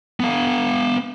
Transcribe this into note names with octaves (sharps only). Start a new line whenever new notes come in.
B3 F5